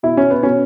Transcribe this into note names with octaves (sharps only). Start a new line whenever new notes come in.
B2 E4
C#4
B3
B2 C#4